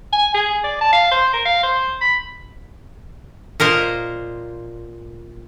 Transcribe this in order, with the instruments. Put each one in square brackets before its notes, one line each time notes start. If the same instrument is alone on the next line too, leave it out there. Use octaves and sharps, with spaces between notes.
[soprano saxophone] G#5
G#4
D5
A5
F5
C5
A#4
F5
C5
B5
[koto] A#2 A#4 C5 D#5